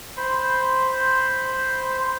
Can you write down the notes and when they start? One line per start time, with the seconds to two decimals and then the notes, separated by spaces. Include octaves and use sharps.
0.17 C5 B5 C6